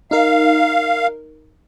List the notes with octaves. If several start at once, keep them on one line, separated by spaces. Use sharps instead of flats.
D#4 A#4 F5